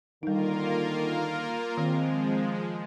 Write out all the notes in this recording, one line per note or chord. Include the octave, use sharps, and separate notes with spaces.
D3 D#3 G3 A#3 D#4 F4 A#4
D#3 F3 G#3 C4